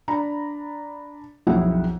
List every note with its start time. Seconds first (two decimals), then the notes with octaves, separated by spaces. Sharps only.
0.08 D4 A#5 B5
1.47 B1 F2 E4 G#4 F#5 G5